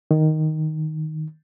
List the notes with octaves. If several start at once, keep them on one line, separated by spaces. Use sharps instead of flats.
D#3